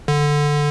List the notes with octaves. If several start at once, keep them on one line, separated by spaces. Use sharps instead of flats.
D3